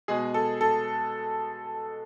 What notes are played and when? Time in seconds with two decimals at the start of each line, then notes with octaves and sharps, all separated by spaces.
0.08 B2 G#3 G#4
0.34 A4
0.61 A4